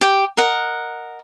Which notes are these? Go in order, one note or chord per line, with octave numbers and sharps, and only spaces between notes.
G4 G5
A#4 D#5 F#5